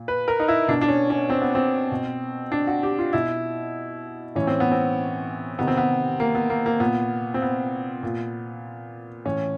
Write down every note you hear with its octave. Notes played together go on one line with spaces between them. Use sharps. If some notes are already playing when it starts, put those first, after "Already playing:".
Already playing: A#2
B4
A#4
D#4
E4
B2 D4
D4
C#4
C#4
C4
B3
C4
B2
D4
F#4
G4
F4
B2 E4
A2 E3 C#4
C4
B3
C4
C3 D#3 B3
C4
B3
A#3
B3
A#3
A#3
A#2 B3
C4
B3
A#2
A2 E3 C#4